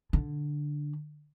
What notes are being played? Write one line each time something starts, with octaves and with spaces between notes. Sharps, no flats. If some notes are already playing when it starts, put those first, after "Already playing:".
D3